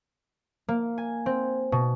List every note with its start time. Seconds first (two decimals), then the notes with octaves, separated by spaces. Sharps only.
0.69 A#3
0.98 G#5
1.26 C4
1.72 B2